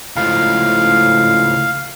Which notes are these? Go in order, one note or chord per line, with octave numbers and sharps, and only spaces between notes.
C#2 A2 F3 F5